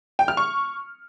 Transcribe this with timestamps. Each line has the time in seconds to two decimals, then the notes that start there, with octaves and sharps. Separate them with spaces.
0.19 G5
0.28 F6
0.37 C#6